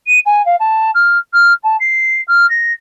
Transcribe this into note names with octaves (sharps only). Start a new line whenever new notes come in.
D#7
G#5
F5
A5
F6
F6
A5
C7
F6
A#6